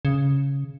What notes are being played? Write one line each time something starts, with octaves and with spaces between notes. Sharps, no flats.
C#3